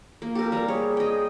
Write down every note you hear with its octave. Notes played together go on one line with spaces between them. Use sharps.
A#3
G4 A4 A#4
G3 A#4
G#4 C#5
D#5 G5